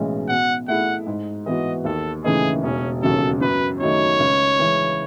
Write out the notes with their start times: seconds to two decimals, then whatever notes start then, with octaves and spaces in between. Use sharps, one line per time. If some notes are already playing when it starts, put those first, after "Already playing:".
Already playing: B1 A2 E3 G#3 C#4
0.29 B2 F#5
0.68 A3 E4 G#4 F#5
1.07 G#2
1.46 E3 B3 F#4 D#5
1.85 D#2 A4
2.24 C#3 E3 A3 D#4 G#4
2.63 E1 C#4
3.02 D#2 C#3 F#3 A4
3.41 F#2 B4
3.80 D#3 F#3 A3 D#4 C#5
4.20 C#2
4.59 C#3 E3 G#3